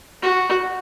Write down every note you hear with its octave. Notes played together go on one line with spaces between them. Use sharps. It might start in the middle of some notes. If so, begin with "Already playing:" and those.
F#4